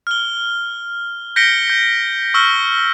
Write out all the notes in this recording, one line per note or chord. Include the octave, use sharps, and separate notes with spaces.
F6 G7
G6 A#6 B6 C#7 D7 G7
G6
C#6 E6 F6 G7